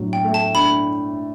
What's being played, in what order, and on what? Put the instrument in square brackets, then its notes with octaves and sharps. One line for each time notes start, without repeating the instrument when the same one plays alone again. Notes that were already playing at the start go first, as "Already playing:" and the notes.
Already playing: [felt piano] A2 F#3 D4
[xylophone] G5
[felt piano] A3
[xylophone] A5
[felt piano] D4 [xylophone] B5